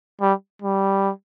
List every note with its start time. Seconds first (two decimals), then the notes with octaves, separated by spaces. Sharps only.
0.21 G3
0.62 G3